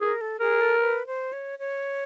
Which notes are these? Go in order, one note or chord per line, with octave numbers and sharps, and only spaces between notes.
G#4 A#4
A4
G#4 A#4
A4
B4
C5
C#5
C#5